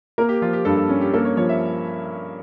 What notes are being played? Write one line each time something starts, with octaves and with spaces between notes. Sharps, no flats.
A#3 A#4
G4
F3 F4
G4
G2 A4
A4
C#4
G4
A#3 A4
C#5
F3 C#5
E5